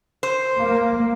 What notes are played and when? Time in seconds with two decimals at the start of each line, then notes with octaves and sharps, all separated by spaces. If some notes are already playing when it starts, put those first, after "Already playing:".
0.23 C5
0.57 A#3